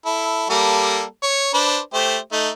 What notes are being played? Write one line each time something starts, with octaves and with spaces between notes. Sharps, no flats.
E4 A4
G3 A#3 A4
C#5
D4 B4 C5
A3 G4 C5
A3 D#4